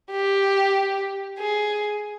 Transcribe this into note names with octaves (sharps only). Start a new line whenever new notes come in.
G4
G#4